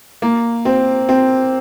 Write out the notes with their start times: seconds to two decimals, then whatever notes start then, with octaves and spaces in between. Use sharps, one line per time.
0.22 A#3
0.65 C4
1.09 C4